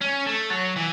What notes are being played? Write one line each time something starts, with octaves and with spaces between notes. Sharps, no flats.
C#4
A3
F#3
E3